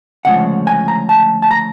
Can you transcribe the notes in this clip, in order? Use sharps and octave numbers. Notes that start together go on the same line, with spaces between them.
D2 C#3 F3 G#3 F#5
G#5
A#5
A5
A5
A#5